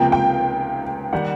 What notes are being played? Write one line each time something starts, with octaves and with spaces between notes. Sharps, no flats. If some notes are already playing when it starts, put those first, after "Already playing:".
Already playing: C#2 C3 F3 A#3 G5
G5
D#3 G3 F#5